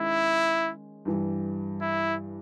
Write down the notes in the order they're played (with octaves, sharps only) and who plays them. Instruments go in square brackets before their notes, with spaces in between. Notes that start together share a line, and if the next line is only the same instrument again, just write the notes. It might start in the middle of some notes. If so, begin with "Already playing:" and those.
Already playing: [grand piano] D#3 G#3 C#4 [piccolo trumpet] E4
[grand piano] G2 E3 G3
[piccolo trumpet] E4